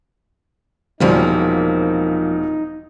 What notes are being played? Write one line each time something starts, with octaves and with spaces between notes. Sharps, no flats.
E1 A#2 F3 G3 A#3 C4 D#4